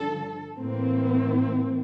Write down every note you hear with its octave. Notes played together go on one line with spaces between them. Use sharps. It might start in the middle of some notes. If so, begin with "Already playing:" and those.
Already playing: G2 D3 F3 A4
A2 E3 A#3 C4